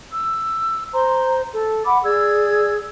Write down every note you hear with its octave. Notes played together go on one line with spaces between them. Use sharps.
E6
C5 A#5 C6
A4
F#5 B5 D6
G#4 D5 E6 G#6